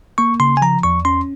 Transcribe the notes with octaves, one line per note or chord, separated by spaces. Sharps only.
A#3 C#6
C#3 C6
G#5
F3 A#5
E2 C#6
C#4 C6